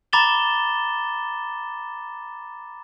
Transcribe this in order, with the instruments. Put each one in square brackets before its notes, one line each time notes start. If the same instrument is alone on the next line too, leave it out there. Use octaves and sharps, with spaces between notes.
[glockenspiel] A#5 B5 D6 A6 E7 G7